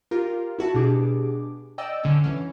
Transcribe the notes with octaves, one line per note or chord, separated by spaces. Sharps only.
F4 G4 A#4
E4 F#4 A5
B2 D4 G4 G#4 D6
D5 D#5 G5 E6
D3 C#4
E3 C#4